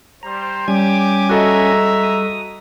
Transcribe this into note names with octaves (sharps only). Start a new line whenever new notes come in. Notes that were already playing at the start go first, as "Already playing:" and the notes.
G3 C5 A#5
G3 C#4 G4 G#5 D6 G#6
G#3 F#4 A4 D#5 E5 A#5
D#6